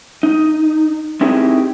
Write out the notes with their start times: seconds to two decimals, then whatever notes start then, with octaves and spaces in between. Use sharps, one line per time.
0.23 D#4
1.21 C4 D#4 E4 G4 G#4 A#4